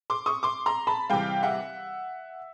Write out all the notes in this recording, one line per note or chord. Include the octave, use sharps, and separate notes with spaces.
C6 D6
C#6 D#6
C6 D6
A#5 C6
A5 B5
C3 E3 G3 F5 G5
E5 F#5